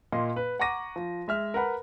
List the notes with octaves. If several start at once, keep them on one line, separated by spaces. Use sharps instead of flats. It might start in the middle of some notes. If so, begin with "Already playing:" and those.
A#2 A#3 D#5 C6
B4
F#5 A#5 C#6 D6 A#6 D#7
F3
G#3 E5 F6
A#4 B4 F#5 B5